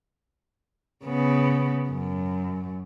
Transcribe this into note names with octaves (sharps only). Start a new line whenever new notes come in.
C#3 B3
F#2